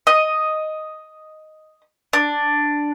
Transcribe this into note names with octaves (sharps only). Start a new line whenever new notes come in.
D#5
D4